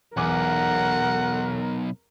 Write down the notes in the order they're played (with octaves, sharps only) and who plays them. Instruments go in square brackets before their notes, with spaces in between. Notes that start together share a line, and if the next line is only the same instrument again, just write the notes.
[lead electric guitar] B1 [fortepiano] E2 G#5 D6 [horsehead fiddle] A#4 [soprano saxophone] F#5